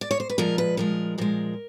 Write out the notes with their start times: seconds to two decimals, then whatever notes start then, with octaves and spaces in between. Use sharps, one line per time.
0.01 D5
0.11 C#5
0.20 C5
0.29 B4
0.38 A#2 F3 G#3 A#4
0.58 B4
0.77 A#2 F3 G#3 A#4
1.18 A#2 F3 G#3 A#4